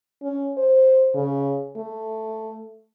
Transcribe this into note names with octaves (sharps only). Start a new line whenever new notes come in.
C#4
C5
C#3
A3